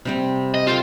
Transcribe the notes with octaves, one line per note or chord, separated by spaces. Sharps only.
C3 G3 C4
D#5
F4 A4 G5 A5